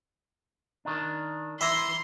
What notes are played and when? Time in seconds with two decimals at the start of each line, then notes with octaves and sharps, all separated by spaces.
0.85 D#3 D4
1.61 E3 E5 A#5 C6